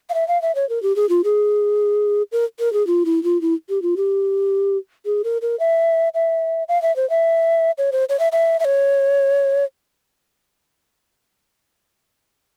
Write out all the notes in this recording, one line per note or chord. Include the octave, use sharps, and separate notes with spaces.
F5
E5
F5
E5
C#5
A#4
G4
G#4
F4
G#4
A#4
A#4
G#4
F4
E4
F4
E4
G4
F4
G4
G#4
A#4
A#4
E5
E5
F5
E5
C5
E5
C#5
C5
C#5
E5
E5
E5
C#5